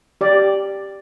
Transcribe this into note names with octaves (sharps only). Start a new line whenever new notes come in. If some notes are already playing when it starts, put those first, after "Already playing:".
G4 D5